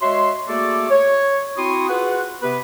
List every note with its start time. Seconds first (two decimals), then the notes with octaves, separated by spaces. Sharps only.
0.01 G#3 F#4 C#5 E5 C6
0.48 A3 A#3 F#4 G#4 A4 D5
0.90 C#5
1.57 C4 E4 F#4 C6 C#6 D#6
1.89 F4 F#4 G#4 B4 F#5
2.42 C3 B3 G4 B4